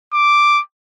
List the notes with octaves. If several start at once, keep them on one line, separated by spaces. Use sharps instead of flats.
D6